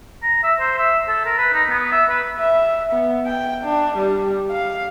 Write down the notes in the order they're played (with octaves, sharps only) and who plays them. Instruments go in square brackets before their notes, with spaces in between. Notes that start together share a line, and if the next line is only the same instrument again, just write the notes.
[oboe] A#5
E5
C5
E5
A4
A#4
B4
D#4
B3
E5
B4
[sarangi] E5
B3
G5
D4
G3
F5